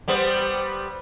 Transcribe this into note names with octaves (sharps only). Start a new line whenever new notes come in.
G3 B3 C5